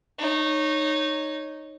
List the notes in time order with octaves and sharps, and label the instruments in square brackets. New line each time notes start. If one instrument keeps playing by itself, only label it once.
[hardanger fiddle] D#4 C#5